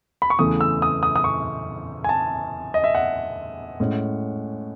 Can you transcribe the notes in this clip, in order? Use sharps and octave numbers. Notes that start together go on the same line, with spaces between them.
B5
C#6
E2 C#3 E3 A3 D#6
E6
D#6
D#6
D#6
C#6
G#5
A5
D#5
E5
F#5
A2 G#3 C#4